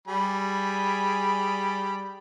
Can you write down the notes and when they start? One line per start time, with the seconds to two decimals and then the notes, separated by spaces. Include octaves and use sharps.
0.08 G3 G#4 B5